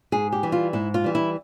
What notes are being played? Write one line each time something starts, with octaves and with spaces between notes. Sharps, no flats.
G#2 G#4
G4
E3 G3
F4
G#2 E4
F4
E3 G3
E4